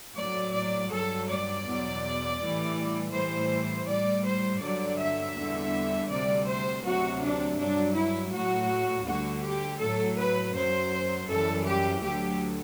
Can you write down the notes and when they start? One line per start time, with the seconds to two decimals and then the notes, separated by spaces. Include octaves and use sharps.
0.16 A2 F#3 D5
0.54 D5
0.90 G2 F#3 A4
1.28 D5
1.65 E2 B2 F#3
2.39 A2 E3 G3
3.12 A2 E3 G3 C5
3.87 A2 G3 D5
4.25 C5
4.61 G2 D3 F#3 D5
4.98 E5
5.35 E2 D3 G3
6.09 D2 C3 G3 D5
6.47 C5
6.84 D2 C3 F#3 F#4
7.21 D4
7.57 G2 F#3 D4
7.95 E4
8.32 A2 F#3 F#4
9.06 D2 D3 G3 F#4
9.43 G4
9.80 A2 F#3 A4
10.18 B4
10.54 F#2 F#3 C5
11.28 F#2 E3 G3 A4
11.66 G4
12.02 D2 D3 F#3 G4